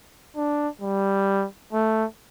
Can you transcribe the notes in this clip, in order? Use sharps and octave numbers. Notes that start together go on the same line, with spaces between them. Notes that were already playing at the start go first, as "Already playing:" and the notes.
D4
G3
A3